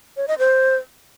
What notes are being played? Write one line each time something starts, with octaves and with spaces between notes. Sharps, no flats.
C#5
D#5
C5